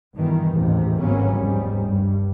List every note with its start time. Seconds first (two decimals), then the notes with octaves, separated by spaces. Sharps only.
0.17 G2 B2 D#3 E3
0.54 A1 D#2 G#2 C3
0.99 G#1 D2 F#3 A#3 B3 C#4
1.35 F1 D#2 G#2 G3
1.85 G2